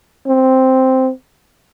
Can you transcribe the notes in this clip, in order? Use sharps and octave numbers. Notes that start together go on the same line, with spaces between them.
C4